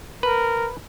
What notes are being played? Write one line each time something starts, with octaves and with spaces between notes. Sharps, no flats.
A#4 B4